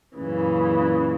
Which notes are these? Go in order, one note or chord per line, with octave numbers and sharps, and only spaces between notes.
F#2 A#2 C#3 E3